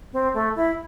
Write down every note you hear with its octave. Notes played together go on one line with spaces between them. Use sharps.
C4
A3
E4